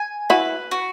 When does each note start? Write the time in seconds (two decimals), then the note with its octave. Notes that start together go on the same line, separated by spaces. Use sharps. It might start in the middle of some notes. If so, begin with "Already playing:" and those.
Already playing: G#5
0.30 E4 F#4 B4
0.71 F#4